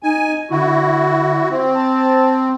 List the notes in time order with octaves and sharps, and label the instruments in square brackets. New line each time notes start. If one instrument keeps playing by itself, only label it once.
[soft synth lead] D#4 [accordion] G#5
[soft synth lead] D3 [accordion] E4 F#4
[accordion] C4
[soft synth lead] A5